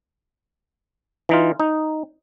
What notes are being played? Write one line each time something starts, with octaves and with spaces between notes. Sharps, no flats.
E3 D#4 F4
D#4